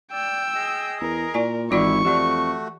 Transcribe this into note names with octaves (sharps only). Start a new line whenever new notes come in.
D5 G5 E6
G#4 D#5
E2 A#4
A#2 E4 D5 G#5
G#1 E3 E4 F4 D5 E5 C#6
F2 A3 F#4 G4 D5